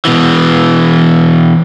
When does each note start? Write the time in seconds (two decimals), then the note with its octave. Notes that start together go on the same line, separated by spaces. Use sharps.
0.05 B2 E3